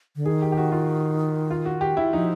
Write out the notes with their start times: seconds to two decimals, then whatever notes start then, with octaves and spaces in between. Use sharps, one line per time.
0.16 D3
0.26 D#3 G#4
0.42 G4
0.52 G4
0.57 F#4
0.72 F4
1.51 F4
1.65 F#4
1.81 G4
1.97 E4
2.13 F3 D#4